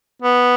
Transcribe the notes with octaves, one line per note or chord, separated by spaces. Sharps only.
B3